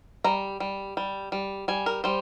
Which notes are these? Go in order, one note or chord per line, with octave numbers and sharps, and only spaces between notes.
G3 A#5
G3
G3
G3
G3 G#5
A#4
G3 C5